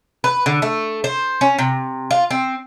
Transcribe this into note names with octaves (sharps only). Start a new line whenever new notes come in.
B4
D3
A3
C5
C#4
C3
F4
C4